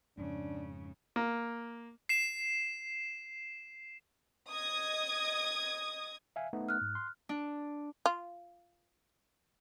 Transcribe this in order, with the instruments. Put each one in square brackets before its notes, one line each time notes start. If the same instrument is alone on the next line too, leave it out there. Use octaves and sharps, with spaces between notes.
[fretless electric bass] F2 G#2 [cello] C#3 [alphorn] D4
[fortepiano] A#3
[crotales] C7 E7
[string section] D#5 D#6 G#6
[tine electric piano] E5 F5 G#5
A3 B3 D#4
[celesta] F6 F#6
[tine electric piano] G#2
C6
[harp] D4
[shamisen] F4